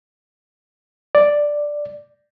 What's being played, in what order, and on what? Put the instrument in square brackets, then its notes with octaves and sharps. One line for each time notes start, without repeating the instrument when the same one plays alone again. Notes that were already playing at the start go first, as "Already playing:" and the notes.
[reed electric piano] D5